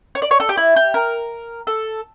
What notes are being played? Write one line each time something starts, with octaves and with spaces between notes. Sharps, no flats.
C#5
D5
C#5
A4
G4
E4
G4
A#4
A4